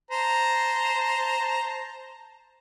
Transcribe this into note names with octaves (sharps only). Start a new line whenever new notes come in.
C5 A5 A#5